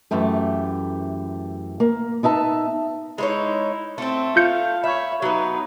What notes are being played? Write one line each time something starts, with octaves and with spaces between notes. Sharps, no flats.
F#2 E3 A3 G4
A#3
B3 D#4 E5 A5
G#3 D#4 E4 C#5
A3 C4 A4
F4 F5 G6 C#7
C#5 E5 B5
F#3 B3 D#4 B4